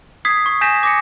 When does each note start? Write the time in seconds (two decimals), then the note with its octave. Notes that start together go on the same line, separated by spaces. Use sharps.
0.25 D#6 G#6 B6 C7
0.46 C#6
0.61 G#5 G6 A#6 B6 E7
0.83 D6 A#6 C#7